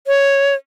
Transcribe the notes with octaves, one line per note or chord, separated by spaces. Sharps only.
C#5